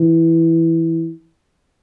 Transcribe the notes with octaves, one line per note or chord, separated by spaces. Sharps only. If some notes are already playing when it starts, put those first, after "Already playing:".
Already playing: E3